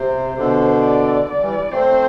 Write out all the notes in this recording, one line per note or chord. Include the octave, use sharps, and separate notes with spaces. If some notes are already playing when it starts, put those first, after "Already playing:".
Already playing: C3 C5
B2 D3 C5
D5
D5
E3 G3
A3 C4 C5